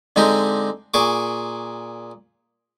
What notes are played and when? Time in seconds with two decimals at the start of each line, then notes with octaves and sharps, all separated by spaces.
0.16 D3 G#3 C4 D#4 G4
0.94 A#2 G#4 C#6 D6